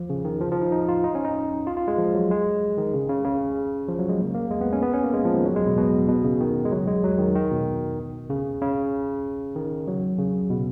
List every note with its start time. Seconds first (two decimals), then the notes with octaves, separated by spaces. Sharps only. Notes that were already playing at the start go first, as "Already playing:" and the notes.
Already playing: F3
0.10 C#3
0.25 D#3
0.40 F3
0.52 F3
0.61 D#4
0.72 D#4
0.89 F4
1.04 D#4
1.15 C#4
1.25 D#4
1.67 F4
1.77 F4
1.88 G#3
1.98 F3
2.14 F#3
2.31 G#3
2.77 D#3
2.94 C#3
3.09 C#3
3.25 C#3
3.88 F3
3.99 F#3
4.09 G#3
4.19 A#3
4.35 A#3
4.50 G#3
4.61 B3
4.73 C#4
4.82 B3
4.94 C#4
5.04 A#3
5.14 G#3
5.25 F3
5.35 D#3
5.45 F#3
5.56 G#3
5.66 B2
5.78 B2
6.08 B2
6.24 C#3
6.40 D#3
6.65 G#3
6.71 F#3
6.87 G#3
7.04 F#3
7.19 D#3
7.35 D#3
7.51 B2
8.30 C#3
8.62 C#3
9.56 D#3
9.88 F#3
10.18 C#3
10.50 B2